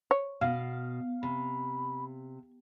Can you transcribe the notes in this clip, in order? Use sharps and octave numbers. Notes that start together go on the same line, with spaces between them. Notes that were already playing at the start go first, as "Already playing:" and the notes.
C#5
B2 F5
C3 B5